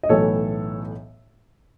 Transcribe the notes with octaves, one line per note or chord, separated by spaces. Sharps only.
D#5
B1 A2 E3 A4 C#5